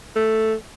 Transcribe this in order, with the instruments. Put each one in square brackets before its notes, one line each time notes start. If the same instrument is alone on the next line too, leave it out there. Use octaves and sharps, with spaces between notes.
[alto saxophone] A3